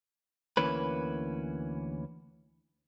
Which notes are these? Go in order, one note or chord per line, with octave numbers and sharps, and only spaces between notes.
D2 E3 A#3 C#4 B4